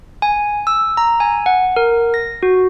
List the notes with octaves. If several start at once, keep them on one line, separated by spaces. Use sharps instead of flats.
G#5
E6
A#5
G#5
F#5
A#4
A#6
F#4